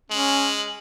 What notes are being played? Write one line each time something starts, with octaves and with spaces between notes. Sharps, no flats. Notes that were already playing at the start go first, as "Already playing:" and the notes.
G#3 C#4 F#7